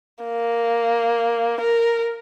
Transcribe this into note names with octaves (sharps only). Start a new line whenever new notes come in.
A#3
A#4